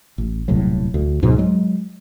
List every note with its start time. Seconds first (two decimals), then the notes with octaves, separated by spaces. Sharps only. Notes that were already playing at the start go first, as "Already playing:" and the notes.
0.18 A1
0.48 D#1 C2 A2 F#3
0.94 D2
1.22 C#2 G#2 B2 F#3
1.38 F#3 G#3